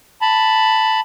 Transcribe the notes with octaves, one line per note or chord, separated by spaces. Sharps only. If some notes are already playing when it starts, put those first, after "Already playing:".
A5 B5